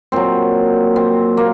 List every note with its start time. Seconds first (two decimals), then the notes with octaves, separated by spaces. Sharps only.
0.12 A#2 F#3 C4
0.96 C4
1.37 A#3